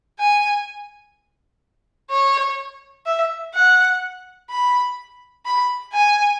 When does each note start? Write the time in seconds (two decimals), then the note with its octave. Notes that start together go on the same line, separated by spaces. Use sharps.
0.19 G#5
2.10 C#5
3.06 E5
3.54 F#5
4.50 B5
5.45 B5
5.93 G#5